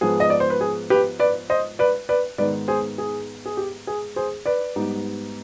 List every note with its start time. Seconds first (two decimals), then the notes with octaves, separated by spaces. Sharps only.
0.01 G#2 F3 B3 G#4
0.20 D#5
0.30 D5
0.40 C5
0.50 B4
0.61 G#4
0.90 G4 B4
1.19 B4 D5
1.50 C5 D#5
1.79 B4 D5
2.09 B4 D5
2.38 G#2 D#3 G#3 B3 B4 D5
2.68 G#4 C5
2.98 G#4
3.46 G#4
3.57 G4
3.87 G#4
4.16 G#4 C5
4.46 B4 D5
4.76 G#2 G3 B3 D#4